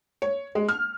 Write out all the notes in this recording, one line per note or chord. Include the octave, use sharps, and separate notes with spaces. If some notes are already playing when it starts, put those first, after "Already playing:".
C#5
G#3
F6